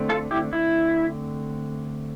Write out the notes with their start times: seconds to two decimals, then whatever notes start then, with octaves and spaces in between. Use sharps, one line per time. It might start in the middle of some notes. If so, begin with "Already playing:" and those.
Already playing: D3 A3 C4
0.09 F4 A4
0.31 E4 G4
0.53 E4